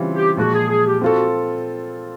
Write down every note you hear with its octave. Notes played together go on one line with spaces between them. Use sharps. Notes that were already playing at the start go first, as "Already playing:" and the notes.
Already playing: C#3 E3 G3 C4 F4
G4
A#2 F3 G#3 F#4
G#4
G#4
G4
C4 F4 F#4 A4